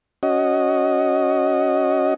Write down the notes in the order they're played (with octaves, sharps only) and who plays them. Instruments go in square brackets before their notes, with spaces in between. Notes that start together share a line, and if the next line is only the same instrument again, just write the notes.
[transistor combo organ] C#4 F#4 D#5